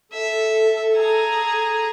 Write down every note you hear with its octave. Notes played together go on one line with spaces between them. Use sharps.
A4 E5
G#4 A#5